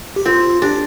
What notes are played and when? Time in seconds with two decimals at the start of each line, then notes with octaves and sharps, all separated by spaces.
0.16 G4
0.25 C4 F4
0.62 D4 G4